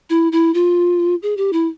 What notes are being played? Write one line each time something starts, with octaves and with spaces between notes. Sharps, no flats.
E4
E4
F4
G#4
G4
E4